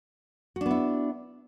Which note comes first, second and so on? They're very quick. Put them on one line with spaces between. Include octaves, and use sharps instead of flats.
F#4 D4 B3 E4